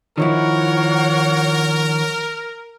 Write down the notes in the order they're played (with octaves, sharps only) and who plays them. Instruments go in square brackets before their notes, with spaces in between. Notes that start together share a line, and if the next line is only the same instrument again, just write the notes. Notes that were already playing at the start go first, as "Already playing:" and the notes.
[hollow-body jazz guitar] D#3 F3 E4 [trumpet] A#4 [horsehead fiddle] C#5 F#5